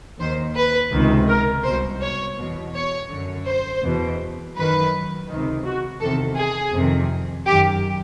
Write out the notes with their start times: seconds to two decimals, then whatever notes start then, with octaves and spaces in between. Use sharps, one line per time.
0.18 D#2 D#3 C5
0.55 B4
0.92 C#2 C3 D#3
1.28 A#4
1.64 C2 B2 C5
2.01 C#5
2.37 E2 B2
2.74 C#5
3.10 F#2 D3
3.46 C5
3.83 E2 B2
4.55 F#2 D#3 B4
5.28 C#2 C3 D#3
5.64 F#4
6.01 E2 C3 D#3 A4
6.38 G#4
6.73 F2 C3 D#3
7.46 F#2 D#3 G4